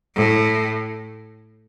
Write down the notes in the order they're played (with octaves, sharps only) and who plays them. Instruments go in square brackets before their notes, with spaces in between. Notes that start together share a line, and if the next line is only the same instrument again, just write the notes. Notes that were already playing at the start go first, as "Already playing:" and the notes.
[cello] A2